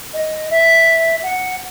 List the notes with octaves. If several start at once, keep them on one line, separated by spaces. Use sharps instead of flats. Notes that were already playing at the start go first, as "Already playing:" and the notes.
D#5
E5
F#5